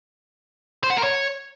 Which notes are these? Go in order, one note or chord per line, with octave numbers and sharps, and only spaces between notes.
C5
F#5
A#4
C#5